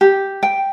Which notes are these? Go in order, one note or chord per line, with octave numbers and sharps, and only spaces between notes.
G4
G5